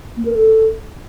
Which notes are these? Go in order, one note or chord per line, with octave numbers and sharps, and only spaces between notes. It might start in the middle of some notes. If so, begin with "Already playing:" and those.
A#3
A#4
A4